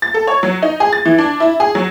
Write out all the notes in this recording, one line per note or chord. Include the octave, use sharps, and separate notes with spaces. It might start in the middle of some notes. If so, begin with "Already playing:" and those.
A6
A4
C#5
F#3
D#4
G#4
A6
E3
D4
E4
G#4
F#3